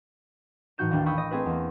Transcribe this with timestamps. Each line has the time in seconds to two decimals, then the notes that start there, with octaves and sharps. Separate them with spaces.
0.78 A2 E3 D#4 F#4 G6 E7
0.91 A1 D#2 D#3 D4 F5 G5
1.06 G5 B5 C#6 D#6 E6 G6
1.18 D#5
1.31 A3 C4 G#4 A4 B4
1.46 E2 A#3